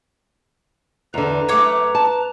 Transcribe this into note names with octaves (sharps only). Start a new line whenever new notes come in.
E2 D3 B4 A#5
F#2 A3 C#5 F#5 D6
A5